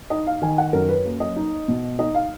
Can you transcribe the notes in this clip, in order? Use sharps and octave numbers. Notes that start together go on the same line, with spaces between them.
D#4 D#5
F5
D#3 G#5
F#5
F#2 A#4
B4
A#3
D#5
D#4
B2
D#4 D#5
F5